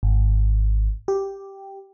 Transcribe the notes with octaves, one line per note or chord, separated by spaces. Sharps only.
G#1
G4